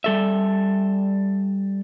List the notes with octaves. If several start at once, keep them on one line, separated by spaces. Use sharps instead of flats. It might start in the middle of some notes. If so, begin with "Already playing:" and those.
G3 A4 E5